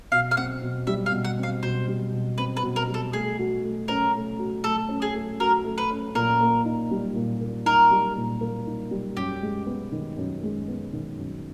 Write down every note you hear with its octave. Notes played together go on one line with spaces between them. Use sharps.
B2 F5
F5
C4 F#5
B2
G3 E5
F5
B2
F#5
C4
F5
B2 C5
G3
B2
C4 B4
B4
B2
A#4
G3
A4
A3 G#4
F#4
A3
C#4 A#4
A3
F#4
A3 A4
C#4
G#4
A3
F#4 A#4
A3
B4
C#4
A#2 A#4
A#3
D#4
G3
A#2
A#3
D#4 A#4
G3
A#2
A#3
D#4
G3
F#2 G4
G#3
B3
D#3
F#2
G#3
B3
D#3
F#2